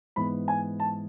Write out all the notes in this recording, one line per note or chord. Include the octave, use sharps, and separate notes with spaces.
G#2 E3 B3 B5
G#5
A5